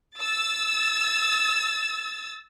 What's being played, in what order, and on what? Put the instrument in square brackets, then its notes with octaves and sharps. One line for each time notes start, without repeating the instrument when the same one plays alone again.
[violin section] E6 A6